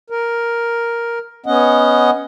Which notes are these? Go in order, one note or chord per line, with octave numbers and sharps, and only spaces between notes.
A#4
B3 C#4 D#5 F#5